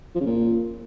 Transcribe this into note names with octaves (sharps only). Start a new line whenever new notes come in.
F3
C#3
A#2